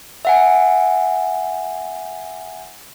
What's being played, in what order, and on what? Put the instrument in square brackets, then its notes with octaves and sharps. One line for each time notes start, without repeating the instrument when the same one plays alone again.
[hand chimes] E5 F#5 G#5